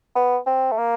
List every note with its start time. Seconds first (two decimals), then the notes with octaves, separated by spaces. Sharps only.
0.15 B3
0.46 C4
0.71 A3
0.78 A#3